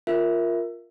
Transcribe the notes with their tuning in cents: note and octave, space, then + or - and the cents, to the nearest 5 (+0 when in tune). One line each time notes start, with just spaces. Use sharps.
F4 +0 A#4 +0 E5 +0